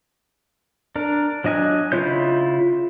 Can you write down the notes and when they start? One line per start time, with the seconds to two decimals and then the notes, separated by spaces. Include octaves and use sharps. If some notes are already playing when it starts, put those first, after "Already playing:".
0.96 D4 A#4
1.44 F#3 D4 D#5 G#5 F#6
1.92 C#3 E4 F4 C#5 G6